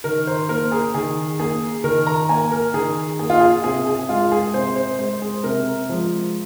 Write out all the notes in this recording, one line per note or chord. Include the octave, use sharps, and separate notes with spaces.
D#3 A#4
C5
A#3 A#4
G#4
D#3 G#4
A#3 G#4
D#3 A#4
A#5
A#3 G#5
A#4
D#3 G#4
A#3 G#4
F4
G#4
C3 G#4
G#4
G#3 F4
G#4
C3 C5
C5
G#3 C5
G#4
C3 A#4
F3 G#3